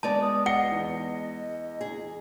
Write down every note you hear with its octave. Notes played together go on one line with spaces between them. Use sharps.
G#3 B3 D5 A5
D#6
D#5 F#5 A#6 C#7 G7
E2
G#4